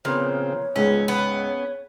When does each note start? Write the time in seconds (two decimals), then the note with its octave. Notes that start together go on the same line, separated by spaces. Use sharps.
0.05 A#2 C#3 F3 B3 C4 C#5 F6
0.76 C#2 G#2 F3 B3 C#4
1.08 B3 C#4